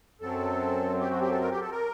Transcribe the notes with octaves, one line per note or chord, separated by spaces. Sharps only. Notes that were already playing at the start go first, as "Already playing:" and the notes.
F#2 F#3 C4 A4
G4
F#4
G4
A4
A#4
G4
A4
A#4